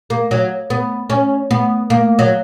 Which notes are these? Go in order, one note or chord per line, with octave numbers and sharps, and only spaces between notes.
A#3
F#3
B3
C#4
B3
A#3
F#3